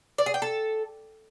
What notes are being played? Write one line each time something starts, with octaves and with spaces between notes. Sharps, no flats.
D5
G#4
G5
A4